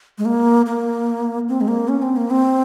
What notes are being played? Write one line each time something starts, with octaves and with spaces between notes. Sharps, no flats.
G#3
A#3
A#3
C4
G#3
A#3
C#4
C4
A#3
C4